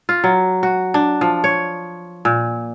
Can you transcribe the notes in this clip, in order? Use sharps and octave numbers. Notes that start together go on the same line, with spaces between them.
F4
F#3
F#4
D4
F3
C#5
A#2